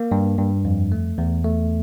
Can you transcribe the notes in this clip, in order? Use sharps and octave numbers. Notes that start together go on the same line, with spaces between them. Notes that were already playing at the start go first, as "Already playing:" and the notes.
Already playing: A#3
G2
G2
F2
A3
E2
A3